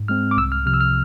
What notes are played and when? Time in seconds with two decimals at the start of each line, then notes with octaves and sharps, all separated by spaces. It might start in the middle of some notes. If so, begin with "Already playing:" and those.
Already playing: G#2
0.08 G#3 C4 F6
0.31 D6
0.37 C2 E6
0.52 F6
0.66 C3 F3 F6
0.74 E6
0.81 F6